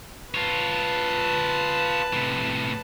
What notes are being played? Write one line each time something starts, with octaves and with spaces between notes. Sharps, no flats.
F4 B4 C#5 A5
A2 C3